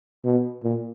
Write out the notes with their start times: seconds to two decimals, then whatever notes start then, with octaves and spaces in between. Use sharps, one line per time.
0.24 B2
0.64 A#2